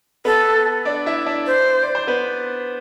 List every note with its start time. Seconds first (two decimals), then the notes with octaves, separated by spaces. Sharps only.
0.25 B3 A4 B4
0.85 D4 D5
1.06 E4 E5
1.26 D4 D5
1.47 C5
1.83 D5
1.95 C5
2.07 B3 B4